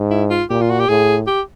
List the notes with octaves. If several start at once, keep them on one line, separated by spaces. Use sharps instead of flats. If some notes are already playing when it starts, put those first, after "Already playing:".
Already playing: G#2
E4
F4
A#2 G4
F4
F#4
G4
A2 G#4
G4